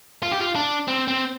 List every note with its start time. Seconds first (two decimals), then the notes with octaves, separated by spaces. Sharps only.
0.23 F4
0.32 G4
0.40 F4
0.55 D4
0.88 C4
1.08 C4